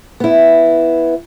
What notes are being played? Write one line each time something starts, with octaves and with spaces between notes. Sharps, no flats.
B3 E4